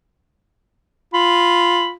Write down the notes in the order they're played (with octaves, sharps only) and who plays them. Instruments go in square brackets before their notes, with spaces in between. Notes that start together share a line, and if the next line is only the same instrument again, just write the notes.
[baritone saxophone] F4 [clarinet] B5